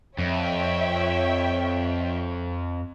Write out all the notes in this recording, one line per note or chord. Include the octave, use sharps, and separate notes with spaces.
F2 C#5 E5 G5